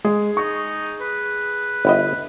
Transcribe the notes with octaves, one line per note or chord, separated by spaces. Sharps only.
G#3 G#4
D#4 C#6
B4
G1 E4 D#5